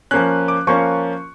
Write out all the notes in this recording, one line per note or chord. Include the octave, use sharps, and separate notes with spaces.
F3 A#3 C#4 F#6
D6
F3 A#3 C#4 C#6